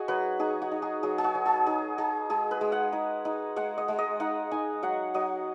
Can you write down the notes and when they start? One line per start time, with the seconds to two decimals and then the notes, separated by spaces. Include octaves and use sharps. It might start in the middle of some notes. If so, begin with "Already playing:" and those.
Already playing: D#4 F#4 G#4
0.08 F#3 B4
0.39 D#4 G#4
0.62 F#4
0.71 D#4
0.82 G#4
1.03 F#3 G#4
1.18 G#4
1.24 F#4
1.35 F#3
1.46 G#4
1.66 D#4 G#4
1.98 D#4 G#4
2.30 G#3 G#4
2.51 B4
2.61 G#3
2.72 F#5
2.93 D#4
3.25 D#4
3.56 G#3 F#5
3.78 D#5
3.88 G#3
3.99 D#5
4.20 D#4 F#5
4.51 D#4 G#5
4.83 F#3 F#5
5.14 F#3 D#5